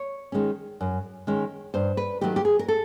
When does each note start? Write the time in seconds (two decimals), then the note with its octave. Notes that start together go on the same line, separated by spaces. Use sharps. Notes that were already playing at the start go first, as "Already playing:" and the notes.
Already playing: C#5
0.32 D#3 G#3 C#4
0.81 F#2
1.27 D#3 G#3 C#4
1.74 G2 C5
1.97 B4
2.21 D#3 F#3 A3 G4
2.36 G4
2.45 G#4
2.59 A#4
2.68 A4